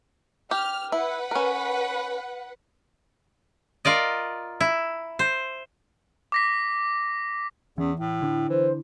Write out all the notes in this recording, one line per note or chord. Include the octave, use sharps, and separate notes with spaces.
G4 F6
E4 B4 F#5
C#4 A#4
F4 A#4 D5 D#5
E4
C5
D6 A#6 B6
E2 E3 C#4
A2 E4
D3 D4
E3 C5